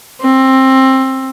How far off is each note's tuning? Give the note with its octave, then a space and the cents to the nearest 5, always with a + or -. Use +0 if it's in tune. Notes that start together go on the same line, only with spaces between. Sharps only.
C4 +20